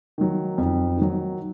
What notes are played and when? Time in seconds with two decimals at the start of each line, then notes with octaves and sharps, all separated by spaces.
0.18 D#3 F#3
0.58 F2
0.97 D#3 F#3